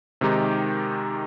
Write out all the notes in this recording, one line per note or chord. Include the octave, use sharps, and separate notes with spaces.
C3 D#3 G#3 D#4 G4